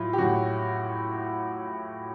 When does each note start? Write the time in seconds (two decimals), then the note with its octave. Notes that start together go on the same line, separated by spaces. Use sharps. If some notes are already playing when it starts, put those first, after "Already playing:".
Already playing: A2 F#3 F4
0.13 G4
0.18 A2 F#3 F#4